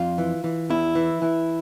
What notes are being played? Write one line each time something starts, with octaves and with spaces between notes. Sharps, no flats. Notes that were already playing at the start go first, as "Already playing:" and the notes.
Already playing: F2 F4
E3
E3
E2 E4
E3
E3